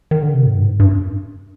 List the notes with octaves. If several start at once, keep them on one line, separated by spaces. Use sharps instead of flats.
D#3
D3
C3
G#2
G2
G#2
G2